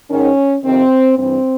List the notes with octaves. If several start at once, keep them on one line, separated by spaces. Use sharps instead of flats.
G#2 D#3 C#4
F2 C3 D#3 C4
G2 E3 C4